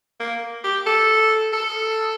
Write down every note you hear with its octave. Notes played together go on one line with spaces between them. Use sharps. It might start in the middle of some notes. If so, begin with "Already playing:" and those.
A#3
G4
A4
A4